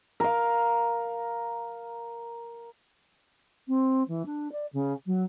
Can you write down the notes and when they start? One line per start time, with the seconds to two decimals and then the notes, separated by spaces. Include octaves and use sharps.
0.20 A#4 F5
3.67 C4
4.08 E3
4.25 D4
4.52 D5
4.73 C#3
5.06 F#3